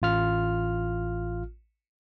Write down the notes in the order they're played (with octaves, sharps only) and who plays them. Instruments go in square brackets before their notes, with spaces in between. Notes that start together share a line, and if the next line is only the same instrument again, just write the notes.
[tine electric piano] A1 F4 F6